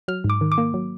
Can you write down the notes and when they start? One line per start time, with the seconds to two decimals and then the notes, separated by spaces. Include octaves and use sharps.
0.08 F#3 F6
0.24 G#2
0.30 D6
0.41 D#3
0.52 D6
0.58 A#3
0.74 F#3